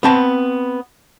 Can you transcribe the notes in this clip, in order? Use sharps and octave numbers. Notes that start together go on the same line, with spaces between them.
B3 C4 A5